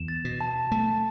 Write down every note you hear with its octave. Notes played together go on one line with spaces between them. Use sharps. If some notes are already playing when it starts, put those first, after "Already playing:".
Already playing: E2 E7
A6
B2
A5
A3 A5